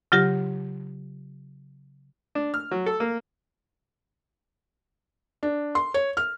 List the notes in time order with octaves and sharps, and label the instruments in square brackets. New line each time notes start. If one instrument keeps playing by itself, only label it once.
[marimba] C#3 F#3 F4 G4 A#6
[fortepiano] D4
F6
F#3
A4
A#3
[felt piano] D4
C6
C#5
F6